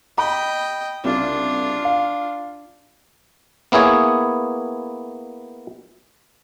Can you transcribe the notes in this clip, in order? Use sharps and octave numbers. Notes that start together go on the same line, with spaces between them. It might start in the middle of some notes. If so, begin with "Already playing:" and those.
D#5 G5 B5
C2 C#3 D4 F4
F5
A#3 B3 E4 G#4 C#5